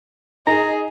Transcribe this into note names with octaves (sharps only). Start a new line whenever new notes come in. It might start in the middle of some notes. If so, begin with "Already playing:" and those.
D#4 G#4 A#5